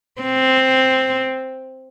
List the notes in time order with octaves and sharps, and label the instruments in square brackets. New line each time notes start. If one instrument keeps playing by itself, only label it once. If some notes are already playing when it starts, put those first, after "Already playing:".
[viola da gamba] C4